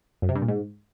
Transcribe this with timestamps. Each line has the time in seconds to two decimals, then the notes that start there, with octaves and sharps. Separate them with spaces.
0.22 F#2
0.29 C3
0.35 G2
0.42 A#2
0.48 G#2